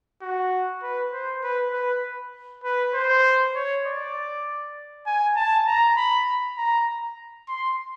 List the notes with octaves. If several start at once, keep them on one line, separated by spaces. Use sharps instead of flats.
F#4
B4
C5
B4
B4
B4
C5
C#5
D5
G#5
A5
A#5
B5
A#5
C6